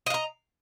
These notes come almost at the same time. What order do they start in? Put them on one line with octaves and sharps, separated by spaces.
D#5 F5 A#5